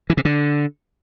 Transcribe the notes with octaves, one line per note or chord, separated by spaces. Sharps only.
E3
C3
D3